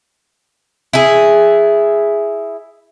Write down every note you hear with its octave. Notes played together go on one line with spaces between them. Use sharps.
E4 G#4